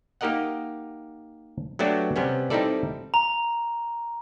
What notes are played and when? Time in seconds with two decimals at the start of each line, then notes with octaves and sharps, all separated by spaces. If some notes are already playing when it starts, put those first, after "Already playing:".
0.21 A#3 D#4 G4 A#4 D#5 F#5
1.79 F#3 A3 B3 D4 F#4 G4
2.16 C3 G3 B3 C#4
2.50 G3 C4 D#4 E4 A4 D5
3.14 A#5